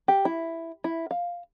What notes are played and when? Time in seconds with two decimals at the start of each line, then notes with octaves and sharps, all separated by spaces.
0.08 G4
0.25 E4
0.84 E4
1.11 F5